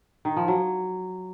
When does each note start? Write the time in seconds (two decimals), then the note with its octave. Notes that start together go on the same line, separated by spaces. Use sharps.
0.25 D#3
0.36 F3
0.48 F#3